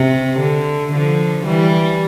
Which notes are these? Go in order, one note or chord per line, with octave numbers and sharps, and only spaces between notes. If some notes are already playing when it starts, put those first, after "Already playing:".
Already playing: C3
D3
D3 F3
E3 G3